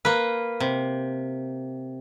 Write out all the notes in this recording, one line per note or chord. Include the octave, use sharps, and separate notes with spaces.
A#3 B4
C3